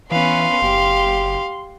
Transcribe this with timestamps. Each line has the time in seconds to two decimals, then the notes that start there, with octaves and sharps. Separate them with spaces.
0.11 E3 B3 C#4 B4 F5 C6
0.62 F#1 G4